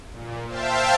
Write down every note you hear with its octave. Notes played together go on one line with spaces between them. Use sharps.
A#2
C5 E5 F5 G5 A5